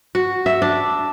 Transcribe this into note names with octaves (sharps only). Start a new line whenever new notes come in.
F#4
E5
D4